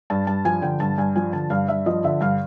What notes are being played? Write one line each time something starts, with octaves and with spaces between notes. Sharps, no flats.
G2 A5
G2 A5
F3 G#5
D3 G5
G2 A5
G2 G#5
F3 G#5
D3 A5
G2 F5
G2 E5
F3 D#5
D3 E5
G2 F5